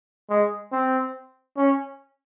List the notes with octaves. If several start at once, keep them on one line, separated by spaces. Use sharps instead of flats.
G#3
C4
C#4